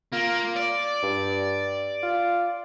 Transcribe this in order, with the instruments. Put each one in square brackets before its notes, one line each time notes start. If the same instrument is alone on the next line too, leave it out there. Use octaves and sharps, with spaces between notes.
[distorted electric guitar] A#3 [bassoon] F4
[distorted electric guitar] D5
[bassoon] G2
F4